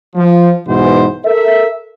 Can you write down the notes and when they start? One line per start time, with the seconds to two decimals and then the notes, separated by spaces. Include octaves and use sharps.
0.16 F3
0.68 B1 G#2 B2 E3 C5
1.25 A4 A#4 E5